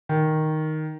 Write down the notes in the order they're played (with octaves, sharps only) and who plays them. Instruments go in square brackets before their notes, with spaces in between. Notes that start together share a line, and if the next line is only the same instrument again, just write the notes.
[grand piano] D#3